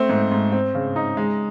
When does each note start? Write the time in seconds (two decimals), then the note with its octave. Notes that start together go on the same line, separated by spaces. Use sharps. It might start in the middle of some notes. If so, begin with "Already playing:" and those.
Already playing: A3 C4
0.09 G#2
0.32 G#2
0.52 C4
0.75 C#3
0.96 D#4
1.17 G#3